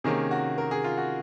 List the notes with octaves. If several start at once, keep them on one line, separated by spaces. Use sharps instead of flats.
C3 D#3 A#3 C#4 G#4
F#4
A#4
G#4
F4
F#4